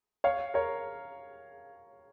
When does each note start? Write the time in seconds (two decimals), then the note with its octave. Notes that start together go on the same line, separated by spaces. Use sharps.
0.24 C#5 F5
0.54 A#4 C#5